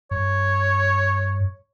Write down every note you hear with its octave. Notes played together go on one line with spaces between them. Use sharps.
G2 C#5